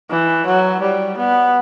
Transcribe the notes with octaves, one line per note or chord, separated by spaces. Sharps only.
E3
F#3
G3
B3